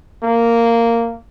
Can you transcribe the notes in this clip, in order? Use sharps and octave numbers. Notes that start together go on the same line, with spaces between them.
A#3